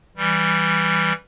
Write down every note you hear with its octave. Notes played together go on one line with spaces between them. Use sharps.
E3 G3